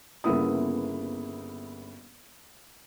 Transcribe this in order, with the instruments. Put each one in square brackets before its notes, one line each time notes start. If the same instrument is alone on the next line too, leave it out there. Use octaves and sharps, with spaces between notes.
[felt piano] G1 C#3 A#3 B3 E4 D#6